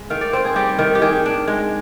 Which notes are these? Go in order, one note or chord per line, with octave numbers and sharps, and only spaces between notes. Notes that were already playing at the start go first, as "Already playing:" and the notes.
Already playing: G#3
D#3 F5
D5
C4 C5
G#4
G3 G4
D#3
G4
D#3 G#4
D4
G#3